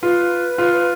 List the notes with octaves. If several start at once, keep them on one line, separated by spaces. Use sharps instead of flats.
F4 B4
F4